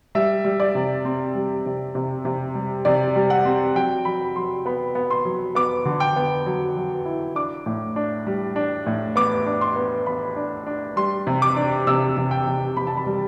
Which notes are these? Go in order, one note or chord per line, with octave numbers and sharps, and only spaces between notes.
G3 E5
G3
D5
C3
C4
G3
C3
C3
C3
G3
C3 D5
G3
F#5
C4
F#3 G5
F#3 B5
F#3 C6
B3 B5
B3
C6
F#3
B3 D6
D3
G5
B3
F#3
F#3
E4
D4 D6
A2
D4
G3
D4
A2
B3 D6
D4
C6
B3
B3 B5
D4
D4
G3 C6
C3
D6
D4
C3 E6
C3
G5
C3
C3 B5
A5
B5
G3